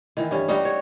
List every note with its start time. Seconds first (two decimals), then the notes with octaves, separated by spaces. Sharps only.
0.17 D#3 E3
0.31 G2 C#4
0.48 G3 D#4 F#4
0.65 C#5